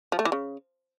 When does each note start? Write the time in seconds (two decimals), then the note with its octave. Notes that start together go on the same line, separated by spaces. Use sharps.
0.12 F3
0.19 A3
0.25 E3
0.32 C#3